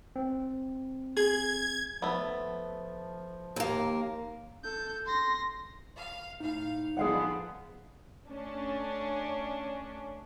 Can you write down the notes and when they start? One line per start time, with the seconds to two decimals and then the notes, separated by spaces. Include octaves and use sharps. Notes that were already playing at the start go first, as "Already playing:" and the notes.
0.16 C4
1.16 G#4 G#6
2.02 F3 A3 B3
3.56 D#2 A#3
4.64 A4 G6
5.06 C6 A#6
5.97 F5
6.40 A2 D#4 F5
6.97 D3 F3 B3 G#4 F5 F#5
8.28 A3 C#4 D4